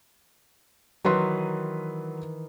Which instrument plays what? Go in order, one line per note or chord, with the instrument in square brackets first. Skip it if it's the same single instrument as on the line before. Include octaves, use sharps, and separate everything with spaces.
[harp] D#3 E3 [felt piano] F#3 B4 C6